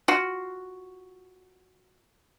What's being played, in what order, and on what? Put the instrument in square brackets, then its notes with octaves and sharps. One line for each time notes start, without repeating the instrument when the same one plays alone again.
[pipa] F4 F#4